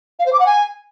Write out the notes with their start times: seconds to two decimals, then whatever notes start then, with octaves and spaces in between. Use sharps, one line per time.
0.19 F5
0.26 C5
0.32 D6
0.39 F#5
0.46 G#5